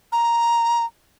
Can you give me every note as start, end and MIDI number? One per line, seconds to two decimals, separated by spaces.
0.12 0.85 82